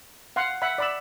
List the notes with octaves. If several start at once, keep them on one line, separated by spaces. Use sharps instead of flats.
F5 F#5 C6
E5 F#5 B5
D5 B5 E6